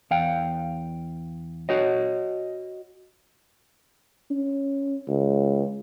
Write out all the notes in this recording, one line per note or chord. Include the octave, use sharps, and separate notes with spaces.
E2 F5 G5
F#4 C#5 D#5
C#4
C#2